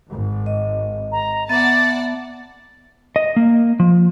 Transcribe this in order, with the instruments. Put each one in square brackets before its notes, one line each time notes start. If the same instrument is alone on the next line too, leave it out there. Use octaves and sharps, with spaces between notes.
[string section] G#1
[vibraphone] D#5
[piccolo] A#5
[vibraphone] B3 E5 [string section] D5 F#5 A5 [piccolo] A6
[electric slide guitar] D#5
A#3
F3